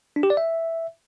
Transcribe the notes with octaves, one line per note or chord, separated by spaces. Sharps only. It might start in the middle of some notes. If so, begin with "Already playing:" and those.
D4
G4
D5
E5